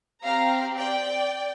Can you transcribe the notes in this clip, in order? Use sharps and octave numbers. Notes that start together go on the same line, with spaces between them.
C4 G4 F5 A#5
D5 G5